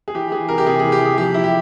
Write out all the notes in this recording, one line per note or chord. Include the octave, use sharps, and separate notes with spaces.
G#4
E3 G4
E3 G#4
C3 A#4
G4
C3 G#4
E3 G#4
G4
E3
G#4
F3 G4
F3 E4
G4